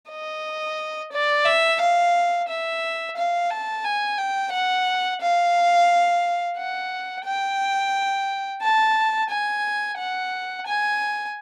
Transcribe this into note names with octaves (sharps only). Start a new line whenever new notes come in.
D#5
D5
E5
F5
E5
F5
A5
G#5
G5
F#5
F5
F#5
G5
A5
G#5
F#5
G#5